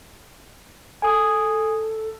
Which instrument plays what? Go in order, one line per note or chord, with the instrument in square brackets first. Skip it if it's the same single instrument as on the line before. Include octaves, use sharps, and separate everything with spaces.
[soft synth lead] A4 [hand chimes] G#5 D#6